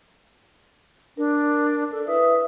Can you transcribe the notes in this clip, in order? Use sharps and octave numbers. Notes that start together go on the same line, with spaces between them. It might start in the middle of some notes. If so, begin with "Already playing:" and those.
D4 A#4
A4 D5
E4 B4 E5 D#6